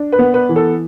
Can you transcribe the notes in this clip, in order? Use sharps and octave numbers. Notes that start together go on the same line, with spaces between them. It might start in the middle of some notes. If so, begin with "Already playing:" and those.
Already playing: D4
B4
B3
B4
E3
A4